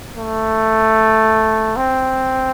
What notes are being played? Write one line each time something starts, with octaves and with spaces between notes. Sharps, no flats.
A3
C4